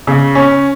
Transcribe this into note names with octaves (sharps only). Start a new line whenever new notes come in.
C#3
C#4